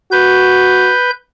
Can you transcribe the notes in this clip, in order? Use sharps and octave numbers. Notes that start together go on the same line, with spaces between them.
F#4 B4 G6